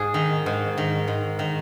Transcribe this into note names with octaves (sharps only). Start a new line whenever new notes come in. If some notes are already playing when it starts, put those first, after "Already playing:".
Already playing: G#2 G#4
D#3
G#2
D#3
G#2
D#3